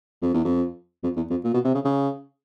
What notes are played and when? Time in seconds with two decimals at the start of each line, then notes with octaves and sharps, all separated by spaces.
0.22 F2
0.34 E2
0.45 F2
1.03 F2
1.16 E2
1.30 F2
1.44 A#2
1.54 B2
1.64 C3
1.74 C#3
1.85 C#3